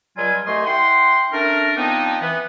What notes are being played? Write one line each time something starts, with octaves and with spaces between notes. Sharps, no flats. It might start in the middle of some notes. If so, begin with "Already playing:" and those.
C#2 F#3 G3 F4 G#5
C2 A3 G4 D#5 G#5 C6
E4 F#5 G5 C6
A3 C#4 D4 A#4
F3 B3 C4 D4 D#4
E3 B3